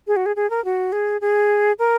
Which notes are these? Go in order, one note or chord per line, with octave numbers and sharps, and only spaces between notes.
G#4
F#4
G#4
G#4
A#4
F#4
G#4
G#4
A#4